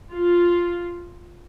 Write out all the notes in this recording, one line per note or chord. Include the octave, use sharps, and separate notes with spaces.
F4